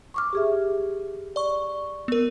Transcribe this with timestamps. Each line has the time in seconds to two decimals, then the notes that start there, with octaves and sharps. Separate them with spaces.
0.14 C#6 D6 F6
0.33 G4 G#4 E5
1.36 D5 C#6
2.08 B3 A#4